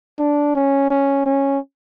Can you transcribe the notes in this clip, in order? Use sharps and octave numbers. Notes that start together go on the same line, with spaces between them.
D4
C#4
C#4
C#4